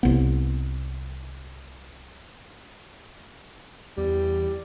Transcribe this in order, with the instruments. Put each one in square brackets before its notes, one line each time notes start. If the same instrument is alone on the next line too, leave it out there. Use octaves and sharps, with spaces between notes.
[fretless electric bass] C2 B3
[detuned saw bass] E2 [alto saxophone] G3